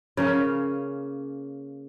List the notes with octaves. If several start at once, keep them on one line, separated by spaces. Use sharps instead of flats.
C#3 A#3 C#4